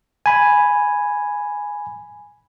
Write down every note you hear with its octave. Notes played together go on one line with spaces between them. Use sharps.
G#5 B5